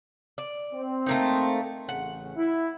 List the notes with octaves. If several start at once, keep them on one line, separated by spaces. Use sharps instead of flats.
D5
C4
A3 A#3 D#4
A1 C#3 F#5
E4